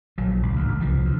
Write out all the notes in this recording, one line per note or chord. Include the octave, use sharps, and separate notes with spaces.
A#1 A#2 F#3
C#2
A1 D2
C2 E3 F3
D2